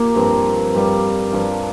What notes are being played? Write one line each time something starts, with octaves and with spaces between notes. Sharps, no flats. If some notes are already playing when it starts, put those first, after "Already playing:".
Already playing: A#3 F4 G4
G2 F3 C4
G2 G3 C4 F4
G2 F3 D4 F4